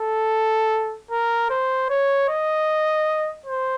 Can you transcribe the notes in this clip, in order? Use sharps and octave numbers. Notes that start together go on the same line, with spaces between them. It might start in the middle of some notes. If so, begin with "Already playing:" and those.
Already playing: A4
A#4
C5
C#5
D#5
C5